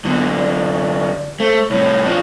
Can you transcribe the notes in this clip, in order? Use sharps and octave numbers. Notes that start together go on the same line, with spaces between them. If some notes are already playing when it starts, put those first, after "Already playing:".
F#2 D3 B3
D5
A3 C5
C2 A2 C#5
F3 D4